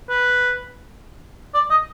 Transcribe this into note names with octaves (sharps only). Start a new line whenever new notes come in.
B4
D5
D#5